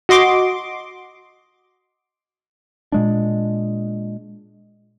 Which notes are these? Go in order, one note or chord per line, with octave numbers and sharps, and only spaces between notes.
F#4 D#5 C6 D6
A#2 G#3 D4